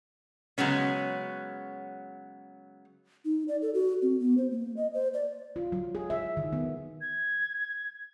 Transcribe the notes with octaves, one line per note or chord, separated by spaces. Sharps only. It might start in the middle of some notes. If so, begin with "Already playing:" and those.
C#3 F#3 G#3 B3 C#4
D#4
D5
A4
F#4
C4
B3
C5
A#3
D#5
C5
D5
F4
F#3
G#4
E5
D#3
B3
G#6